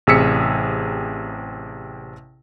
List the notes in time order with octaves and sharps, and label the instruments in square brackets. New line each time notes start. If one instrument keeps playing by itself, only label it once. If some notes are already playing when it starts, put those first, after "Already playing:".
[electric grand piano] A1 C3 G#4 E6 B6 C#7